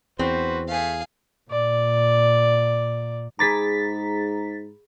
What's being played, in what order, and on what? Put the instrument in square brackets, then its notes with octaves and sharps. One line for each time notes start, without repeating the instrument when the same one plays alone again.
[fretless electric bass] E2 [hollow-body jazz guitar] C4 [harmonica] F#4 B4 C5
[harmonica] A3 [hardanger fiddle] G#4 F5
[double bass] A#2 [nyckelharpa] D5
[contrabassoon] G#2 [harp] G#4 B5 D6 [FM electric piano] A#5 A6 B6